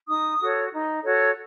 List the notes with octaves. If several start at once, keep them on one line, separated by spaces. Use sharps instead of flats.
D#4 D#6
F#4 A4 C#5
D#4
F#4 A4 C#5